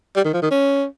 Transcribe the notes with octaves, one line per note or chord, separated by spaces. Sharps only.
G3
D#3
F3
D#3
C#4